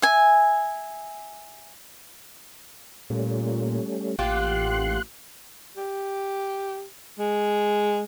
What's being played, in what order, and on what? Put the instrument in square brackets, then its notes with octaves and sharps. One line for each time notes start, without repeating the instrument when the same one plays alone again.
[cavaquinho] E5 G#5
[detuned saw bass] A#2 [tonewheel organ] G3 A3 C#4
[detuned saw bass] A1 [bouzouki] A#3 F4 G4 [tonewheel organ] F#5 C6 F#6
[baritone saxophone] G4
G#3